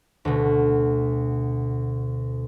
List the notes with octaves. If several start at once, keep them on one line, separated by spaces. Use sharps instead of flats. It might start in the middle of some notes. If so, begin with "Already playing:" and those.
D2 B2